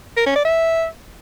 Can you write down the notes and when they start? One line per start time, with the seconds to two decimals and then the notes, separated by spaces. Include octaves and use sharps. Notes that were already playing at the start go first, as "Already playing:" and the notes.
0.17 A#4
0.26 C#4
0.35 D5
0.45 E5